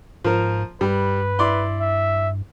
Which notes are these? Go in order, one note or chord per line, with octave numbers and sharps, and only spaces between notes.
G#2 F3 A#4
G2 G3 B4
E4 D5 C6
E5